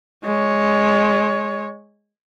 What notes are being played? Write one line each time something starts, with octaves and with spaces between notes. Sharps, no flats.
G#3 C#5